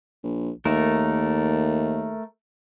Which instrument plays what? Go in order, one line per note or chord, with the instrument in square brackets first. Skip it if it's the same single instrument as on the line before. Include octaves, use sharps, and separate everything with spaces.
[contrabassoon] A#1
[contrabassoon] D#2 [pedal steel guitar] A3 A#4